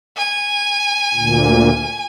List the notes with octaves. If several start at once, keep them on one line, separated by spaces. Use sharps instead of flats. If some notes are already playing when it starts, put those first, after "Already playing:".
G#5
D2 A#2